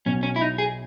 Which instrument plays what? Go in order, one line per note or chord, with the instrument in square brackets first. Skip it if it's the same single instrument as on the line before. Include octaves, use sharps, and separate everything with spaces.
[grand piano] B1 B2 F#3 [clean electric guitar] C#4
[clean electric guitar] C#4
E4
D#4
G#4